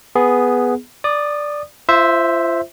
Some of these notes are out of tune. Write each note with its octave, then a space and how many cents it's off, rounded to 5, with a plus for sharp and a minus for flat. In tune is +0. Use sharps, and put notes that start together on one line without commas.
B3 +0 G#4 +0
D5 +0 D#6 -25
F4 -35 C5 +0 E5 +0